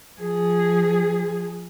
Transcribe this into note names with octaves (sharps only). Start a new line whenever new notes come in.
F3 G#4